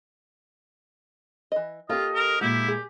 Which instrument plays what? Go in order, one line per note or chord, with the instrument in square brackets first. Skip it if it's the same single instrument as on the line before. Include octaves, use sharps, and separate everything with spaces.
[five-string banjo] E3 D#5
[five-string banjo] A#3 C#5 F5 [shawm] F4 [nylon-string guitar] G4 A4 [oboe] D#5
[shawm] A#4
[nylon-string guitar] A#2 G#3 [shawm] E4 [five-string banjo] F#4 [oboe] G4
[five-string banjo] G#4